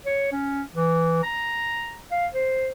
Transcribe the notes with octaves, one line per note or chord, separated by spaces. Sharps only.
C#5
C#4
E3
A#5
F5
C5